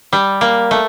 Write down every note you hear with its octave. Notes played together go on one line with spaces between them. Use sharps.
G3
A#3
A3